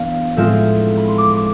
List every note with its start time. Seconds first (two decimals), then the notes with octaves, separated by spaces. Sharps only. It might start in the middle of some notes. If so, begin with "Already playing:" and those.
Already playing: E3 B3 D4 F5
0.36 A2 F3 G#3 C4 F4 E5
0.98 B5
1.08 C6
1.18 D6
1.37 D6